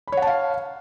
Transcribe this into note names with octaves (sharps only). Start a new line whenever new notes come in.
C#5 F5 F#5 A5 B5